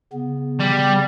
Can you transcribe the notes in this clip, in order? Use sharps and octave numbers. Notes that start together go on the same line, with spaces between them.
C#3 B3
G3